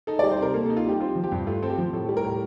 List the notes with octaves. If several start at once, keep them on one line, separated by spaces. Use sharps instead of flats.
D#4 A4
D5
G3
C5
C3 A#4
A#3 A4
A4
D#4
F4
G3 G4
C4 F4
F3
G4
G2
A3 F4
C4 A4
G4
F3
A2 A4
G3
A#4
A2